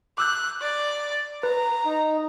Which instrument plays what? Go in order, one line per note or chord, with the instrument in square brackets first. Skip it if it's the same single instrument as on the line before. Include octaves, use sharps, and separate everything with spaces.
[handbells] D6 E6 G6 [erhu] F#6
[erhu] D5
[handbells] B4 [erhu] A#5
[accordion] D#4